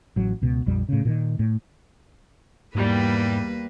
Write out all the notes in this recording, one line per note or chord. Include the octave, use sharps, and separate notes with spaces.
A1 F#3
C#2 B2
A#1 F2 G3
A2 C#3
A#2 D3 D#3
A2
E2 G#2 G3 A#3 B4